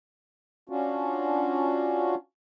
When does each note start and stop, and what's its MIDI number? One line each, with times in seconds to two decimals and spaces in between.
0.69 2.15 61
0.69 2.15 62
0.69 2.15 65
0.69 2.15 66